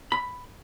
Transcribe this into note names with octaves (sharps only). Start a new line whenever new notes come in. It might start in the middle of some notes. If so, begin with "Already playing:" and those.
B5